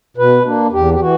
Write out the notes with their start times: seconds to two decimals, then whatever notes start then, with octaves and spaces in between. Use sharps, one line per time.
0.17 B2 B4
0.45 A#3 D4
0.72 E2 G4
0.94 G4
1.00 E3 F#4